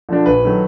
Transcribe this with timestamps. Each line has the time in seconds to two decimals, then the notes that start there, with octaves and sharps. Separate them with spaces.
0.09 D3 F3 A3 D4
0.26 A#1 B4
0.44 D#3 F#3 A3